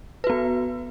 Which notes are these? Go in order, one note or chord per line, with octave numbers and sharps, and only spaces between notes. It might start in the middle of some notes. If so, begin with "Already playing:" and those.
B3 F#4 B4